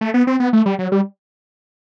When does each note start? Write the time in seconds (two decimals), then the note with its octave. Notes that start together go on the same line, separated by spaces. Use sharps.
0.01 A3
0.14 B3
0.27 C4
0.40 B3
0.53 A3
0.66 G3
0.79 F#3
0.92 G3